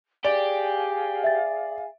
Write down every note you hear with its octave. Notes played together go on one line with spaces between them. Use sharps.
G4 G#4 D5 F5 G#5
E5 A6